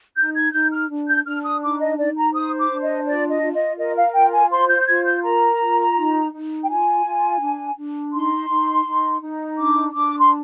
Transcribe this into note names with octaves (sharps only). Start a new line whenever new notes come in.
D#4 G6
G#6
D#4 G6
F6
D4
G6
D4 F6
D#6
D#4 D6
D#5
D#4 D5
A#5
C5 D#6
D6
D4
D#5
F4 D5
D#5
F4
D#5
A#4 D#5
F5
F4 G5
G#5
C5 C6
G6
G6
F4 G#6
G6
A#4 A#5
F4
D#4
D#4
G5
F4 G#5
F4
D4
D4
D#4 C6
D#4
D#4
D#4
D4 D6
D4 D6
C6